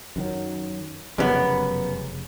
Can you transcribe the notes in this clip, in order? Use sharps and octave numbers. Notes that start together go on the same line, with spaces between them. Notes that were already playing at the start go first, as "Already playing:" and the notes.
F#2 D#3 F#3
F1 F#2 C#3 G3 B3